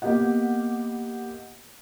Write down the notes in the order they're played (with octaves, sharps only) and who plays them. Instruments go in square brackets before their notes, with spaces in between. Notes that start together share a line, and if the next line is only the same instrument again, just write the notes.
[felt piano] A#3 B3 G4 D#5 F#5